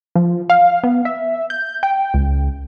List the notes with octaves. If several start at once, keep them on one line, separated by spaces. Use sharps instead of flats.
F3
F5
B3
E5
G6
G5
C#2